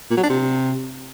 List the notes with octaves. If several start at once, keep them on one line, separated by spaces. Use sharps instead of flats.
A#2
F#3
D4
C3